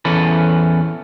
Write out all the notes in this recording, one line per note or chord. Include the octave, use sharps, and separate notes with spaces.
E2 E3 C#4 A4 B4